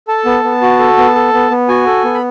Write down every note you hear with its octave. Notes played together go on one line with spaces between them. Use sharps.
A4 A5
B3
B3
F#4
A4
B3
A4
B3
B3
F#4 G#5
A4
B3
B5